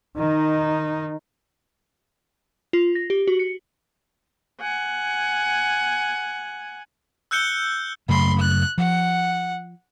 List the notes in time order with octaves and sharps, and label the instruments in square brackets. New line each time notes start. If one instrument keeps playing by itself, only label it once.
[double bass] D#3 D#4
[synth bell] F4
A#6
G4
F#4
C#7
[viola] F#5 G#5
[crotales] E6 F#6 G6 C#7 G7
[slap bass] F#2 C#3 A3 [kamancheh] B5 C6
[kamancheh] F#6
[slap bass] F3 [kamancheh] F#5